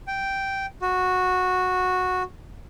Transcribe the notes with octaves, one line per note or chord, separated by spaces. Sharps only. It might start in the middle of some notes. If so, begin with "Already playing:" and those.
G5
F#4